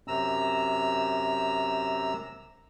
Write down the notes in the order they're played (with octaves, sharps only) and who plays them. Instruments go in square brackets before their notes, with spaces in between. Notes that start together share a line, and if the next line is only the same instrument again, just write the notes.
[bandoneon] F#2 C3 A#5 E6